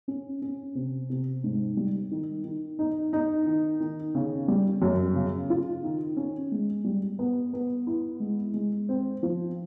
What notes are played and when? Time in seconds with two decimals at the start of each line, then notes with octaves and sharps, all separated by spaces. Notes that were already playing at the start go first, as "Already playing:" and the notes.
0.08 C#4
0.42 C#4
0.75 C3
1.10 C3
1.44 G#2
1.77 G3
2.11 D#3
2.45 D#3
2.79 D#4
3.13 D#4
3.46 D#3
3.80 D#3
4.15 C#3
4.48 G3
4.82 F#2
5.15 C#3
5.50 F4
5.84 D#3
6.17 C#4
6.52 G#3
6.84 G3
7.19 B3
7.53 B3
7.87 E4
8.20 G#3
8.54 G#3
8.89 C4
9.23 F3